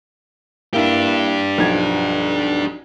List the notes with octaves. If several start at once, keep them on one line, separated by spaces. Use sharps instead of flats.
A#3 D4 E4 G4
B1 F3 G#6